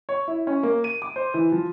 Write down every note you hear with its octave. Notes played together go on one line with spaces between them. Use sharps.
C#5
E4
C#4
A#3
D#7
D6
C5
E3
F3